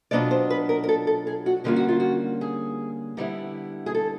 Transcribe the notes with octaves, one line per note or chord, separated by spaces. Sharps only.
B2 F#3 B3 D4 F4 D5
C5
B4
A#4
A#4
A4
A4
G#4
F#4
D3 G3 A#3 C#4 F4 G4
F#4
F4
F#4
G#4
D3 G3 B3 E4
G#4
A4